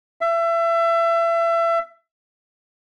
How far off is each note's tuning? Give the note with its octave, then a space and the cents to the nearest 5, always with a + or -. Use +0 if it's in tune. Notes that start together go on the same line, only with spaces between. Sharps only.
E5 +30